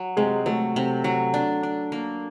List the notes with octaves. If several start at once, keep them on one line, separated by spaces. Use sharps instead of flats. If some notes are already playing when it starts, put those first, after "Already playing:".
Already playing: F#3
C3 G#3 G#4
F#3 A3 A4
C3
F#3
D4
D4
A#3